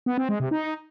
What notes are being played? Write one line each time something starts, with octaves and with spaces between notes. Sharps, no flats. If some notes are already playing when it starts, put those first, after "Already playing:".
B3
C4
G#3
C3
D#4